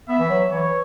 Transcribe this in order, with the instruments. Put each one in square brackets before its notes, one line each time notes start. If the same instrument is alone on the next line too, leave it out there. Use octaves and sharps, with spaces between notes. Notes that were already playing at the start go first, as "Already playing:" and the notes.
[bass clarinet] B3 [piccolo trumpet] E5
[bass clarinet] E3
F#3
[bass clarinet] E3 [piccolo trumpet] C#5